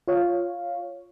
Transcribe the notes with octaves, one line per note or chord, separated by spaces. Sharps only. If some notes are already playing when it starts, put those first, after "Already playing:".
F4 C#5 F5